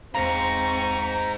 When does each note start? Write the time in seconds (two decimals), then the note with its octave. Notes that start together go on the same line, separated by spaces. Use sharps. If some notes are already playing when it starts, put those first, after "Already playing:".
0.15 E2 G#2 C4 C5 F5 A#5 C#6